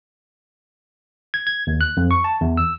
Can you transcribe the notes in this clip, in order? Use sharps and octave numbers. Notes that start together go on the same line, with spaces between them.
G#6
G#6
D#2
F#6
F2
C#6
A5
E2
E6